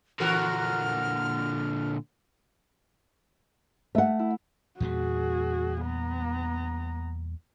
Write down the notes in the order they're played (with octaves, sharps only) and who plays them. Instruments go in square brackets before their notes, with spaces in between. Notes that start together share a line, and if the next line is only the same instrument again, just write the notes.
[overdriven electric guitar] A#2 D3 [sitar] E3 F#4 A#4 [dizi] F6
[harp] A3 [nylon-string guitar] E5 F#5
[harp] E4
[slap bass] E2 A#2 G3 [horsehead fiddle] F#4 G#4
[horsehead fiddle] B3 A#5